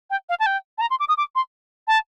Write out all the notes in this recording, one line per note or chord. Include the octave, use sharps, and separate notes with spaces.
G5
F5
A5
G5
A5
A#5
C6
D6
D#6
D6
C6
A5